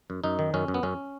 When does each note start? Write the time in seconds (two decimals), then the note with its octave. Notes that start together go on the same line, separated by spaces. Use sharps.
0.10 F#2
0.24 F#2 D#4
0.39 D#3
0.54 F#2 C#4
0.68 F#2
0.74 B3
0.83 F#2 C#4